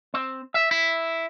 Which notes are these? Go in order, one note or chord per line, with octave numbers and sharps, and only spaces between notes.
C4
E5
E4